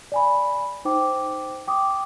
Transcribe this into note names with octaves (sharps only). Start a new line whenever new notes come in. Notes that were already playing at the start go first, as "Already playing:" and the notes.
D5 G#5 B5
D#4 C5 G5 D6
G5 D6 D#6